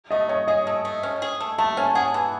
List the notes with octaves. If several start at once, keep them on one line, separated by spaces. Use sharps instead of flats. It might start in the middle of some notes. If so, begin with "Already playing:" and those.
A3 D#5
C#4 C#5
G#4 D#5
A3
A3
C#4
G#4
A3
A3 A5
C#4 G#5
G#4 F#5
E3